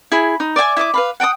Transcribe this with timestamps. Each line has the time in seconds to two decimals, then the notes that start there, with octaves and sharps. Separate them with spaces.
0.12 E4 G#4 B5
0.40 D#4
0.56 D5 E5 G5 G#5
0.77 E4 D#5 E5 D6
0.94 B4 F5 B5
1.20 F#5 G5 A5 D#6